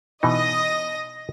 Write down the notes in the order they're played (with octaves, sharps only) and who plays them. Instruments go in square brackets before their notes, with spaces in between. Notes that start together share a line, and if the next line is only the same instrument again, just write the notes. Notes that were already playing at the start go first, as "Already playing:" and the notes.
[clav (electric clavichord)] B2 E3 D#4 [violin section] D#5 D#6 A#6